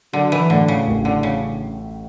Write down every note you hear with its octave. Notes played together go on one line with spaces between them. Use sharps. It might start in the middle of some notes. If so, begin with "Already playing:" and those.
D3 F#3
E3
A2 D3
C#3
A1
D3
C#3